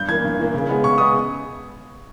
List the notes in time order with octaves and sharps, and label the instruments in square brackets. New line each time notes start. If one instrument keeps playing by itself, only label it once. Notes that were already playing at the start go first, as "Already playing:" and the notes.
Already playing: [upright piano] G2 G6
E3 A#3 G#6
G2
E3 A#3
C#3
G#3 B3
C#3 C#6
G#3 B3 D#6